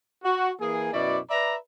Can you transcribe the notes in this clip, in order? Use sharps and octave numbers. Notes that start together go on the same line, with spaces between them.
F#4
E3 A#3 G#4
F#2 B2 E4 D5
B4 D5 E5 A#5